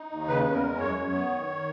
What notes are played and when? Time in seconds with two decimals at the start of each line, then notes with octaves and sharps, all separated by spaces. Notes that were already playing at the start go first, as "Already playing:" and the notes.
Already playing: D#4
0.11 D#2
0.28 C#3 B4
0.45 E2
0.53 A#4
0.62 G#3
0.78 F#2 C#5
0.95 F#2
1.12 B3
1.29 D#3
1.47 D#3